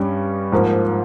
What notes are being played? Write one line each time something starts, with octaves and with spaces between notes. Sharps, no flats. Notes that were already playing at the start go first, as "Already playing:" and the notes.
Already playing: G2 G3 C#4
G#2 F3 A#3